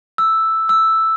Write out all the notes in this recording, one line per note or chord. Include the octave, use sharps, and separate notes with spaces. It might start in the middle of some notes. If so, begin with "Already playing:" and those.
E6
E6